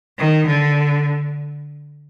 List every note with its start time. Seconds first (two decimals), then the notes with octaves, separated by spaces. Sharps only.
0.18 D#3
0.47 D3